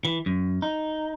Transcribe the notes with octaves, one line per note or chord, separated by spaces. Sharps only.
E3
F#2
D#4